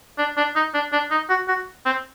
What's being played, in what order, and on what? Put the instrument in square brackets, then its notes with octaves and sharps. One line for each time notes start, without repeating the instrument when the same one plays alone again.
[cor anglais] D4
D4
D#4
D4
D4
D#4
F#4
F#4
C4